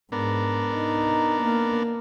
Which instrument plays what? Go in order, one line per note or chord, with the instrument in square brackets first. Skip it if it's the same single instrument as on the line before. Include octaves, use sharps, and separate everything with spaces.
[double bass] G#2 [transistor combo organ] B3 D4 A#4
[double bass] D#4
A#3